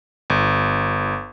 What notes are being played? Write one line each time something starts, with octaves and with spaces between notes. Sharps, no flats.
G1